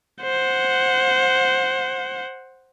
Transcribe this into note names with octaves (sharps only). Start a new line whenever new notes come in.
C5 F#5